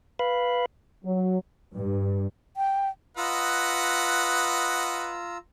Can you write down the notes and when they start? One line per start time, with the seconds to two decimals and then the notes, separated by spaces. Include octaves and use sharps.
0.19 B4 F5 B5
1.05 F#3
1.75 G2
2.57 G5
3.17 F4 B4 D#5 F#5 A#5 E6